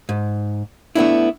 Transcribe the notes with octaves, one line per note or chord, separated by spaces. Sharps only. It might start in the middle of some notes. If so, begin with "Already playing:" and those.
G#2
A3 B3 D4 E4